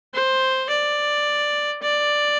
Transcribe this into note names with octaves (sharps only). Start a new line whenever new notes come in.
C5
D5
D5